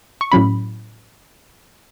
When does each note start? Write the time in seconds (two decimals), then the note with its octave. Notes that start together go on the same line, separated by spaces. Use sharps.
0.21 C#6
0.32 A2 F#3 C#4 B5